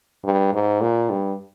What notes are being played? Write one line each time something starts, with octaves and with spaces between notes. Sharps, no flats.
G2
G#2
A#2
G2